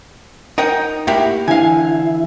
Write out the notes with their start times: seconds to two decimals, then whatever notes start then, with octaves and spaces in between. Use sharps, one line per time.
0.58 D#4 A#4 F#5 G5
1.07 A2 A#3 E4 G4 E5 F#5
1.48 D3 E3 E4 F5 G#5